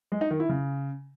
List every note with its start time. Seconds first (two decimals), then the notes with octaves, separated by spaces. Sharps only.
0.12 G#3
0.21 D#4
0.30 D#3
0.40 E4
0.49 C#3